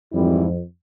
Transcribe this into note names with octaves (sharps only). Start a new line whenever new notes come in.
F2 G#2 E3 G3 C4 E4